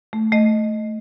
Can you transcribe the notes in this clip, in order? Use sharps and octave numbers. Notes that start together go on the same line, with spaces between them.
A3
A3 D#5